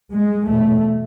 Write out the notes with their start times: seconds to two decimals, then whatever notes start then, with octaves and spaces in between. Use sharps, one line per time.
0.12 G#3
0.48 E2 B2 A3